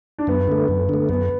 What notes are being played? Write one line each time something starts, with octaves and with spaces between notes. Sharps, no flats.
D4
F#2 B3
D3 A3
F#2
D3 A3
F#2 B3